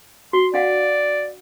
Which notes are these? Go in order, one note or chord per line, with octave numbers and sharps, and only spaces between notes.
F#4 C6
D4 D5 F5 F#5